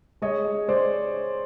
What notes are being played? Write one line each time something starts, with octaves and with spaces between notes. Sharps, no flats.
G#3 C#5 D#5
G#3
G#3 C5 D5